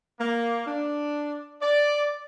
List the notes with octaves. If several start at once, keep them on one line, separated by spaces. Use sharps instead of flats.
A#3
D4
D5